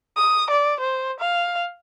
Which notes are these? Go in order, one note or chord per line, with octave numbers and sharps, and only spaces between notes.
D#6
D5
C5
F5